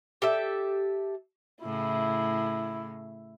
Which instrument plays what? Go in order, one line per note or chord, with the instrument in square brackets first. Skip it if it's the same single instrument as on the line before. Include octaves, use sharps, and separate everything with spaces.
[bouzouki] G4 A4 E5
[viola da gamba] A2 C#3 [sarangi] E4